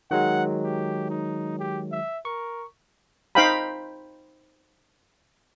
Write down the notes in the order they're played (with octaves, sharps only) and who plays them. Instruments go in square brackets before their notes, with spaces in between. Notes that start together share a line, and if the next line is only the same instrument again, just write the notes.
[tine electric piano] D#3 F#3 G#3 [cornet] F#5
[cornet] G4
D#4
G4
E5
[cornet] A#4 [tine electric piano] C#6
[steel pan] D#4 C5 F5 G5 A#5 B5